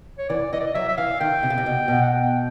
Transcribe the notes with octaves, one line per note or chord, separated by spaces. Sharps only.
C#5
E3 D5
E3 D#5
D5
D#5
F#3 E5
E5
E3 F5
D#3 G5
C3
C#3
C3
B2
B2
F#5
G5